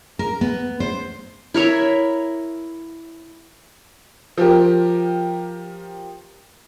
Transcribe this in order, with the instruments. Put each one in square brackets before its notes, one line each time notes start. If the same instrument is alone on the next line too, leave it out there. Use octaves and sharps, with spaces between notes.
[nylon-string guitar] A#4
B3
C5
[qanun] E4 A#4 C#5 E5
[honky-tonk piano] F3 G4 A#4